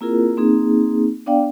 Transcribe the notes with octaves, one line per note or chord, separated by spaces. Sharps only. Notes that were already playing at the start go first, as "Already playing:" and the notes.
A#3 C4 E4 F4 G#4 A#4
A#3 C4 D#4 G#4
B3 D4 D5 F5 G5